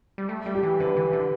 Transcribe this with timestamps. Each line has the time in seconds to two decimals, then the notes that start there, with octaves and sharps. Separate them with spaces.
0.18 G3
0.29 A3
0.46 G3
0.55 G4
0.63 E3
0.80 D3 B4
0.97 E3
1.13 D3